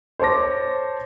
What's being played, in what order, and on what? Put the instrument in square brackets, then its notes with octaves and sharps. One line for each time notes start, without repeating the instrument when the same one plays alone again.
[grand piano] C5 C#5 A5 D6 A#6